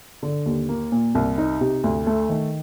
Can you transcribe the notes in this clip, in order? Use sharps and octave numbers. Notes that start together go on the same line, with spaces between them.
D3
D#2
A#3
A#2
C2
D#4
C3
D2
A3
D#3